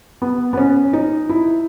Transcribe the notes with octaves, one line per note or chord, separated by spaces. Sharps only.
B3
B3
C#4
D#4
E4